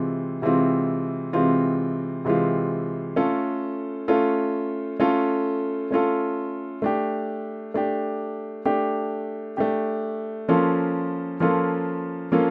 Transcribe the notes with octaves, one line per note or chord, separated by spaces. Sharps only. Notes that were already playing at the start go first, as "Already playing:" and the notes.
Already playing: C3 E3 G#3 C4 F4
C3 E3 G#3 C4 F4
C3 E3 G#3 C4 F4
C3 E3 G#3 C4 F4
A3 C#4 F4 A4
A3 C#4 F4 A4
A3 C#4 F4 A4
A3 C#4 F4 A4
A3 D4 G4
A3 D4 G4
A3 D4 G4
A3 D4 G4
F3 A#3 C#4 F4 A4
F3 A#3 C#4 F4 A4
F3 A#3 C#4 F4 A4